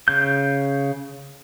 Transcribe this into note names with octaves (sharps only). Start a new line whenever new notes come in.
C#3 G6